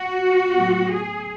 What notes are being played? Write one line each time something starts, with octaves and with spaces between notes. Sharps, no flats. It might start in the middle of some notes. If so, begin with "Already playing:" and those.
Already playing: F#4
A2 F#3 B3
G#4